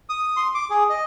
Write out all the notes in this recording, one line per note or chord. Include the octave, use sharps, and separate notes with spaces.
D#6
C6
D6
G#4
D#5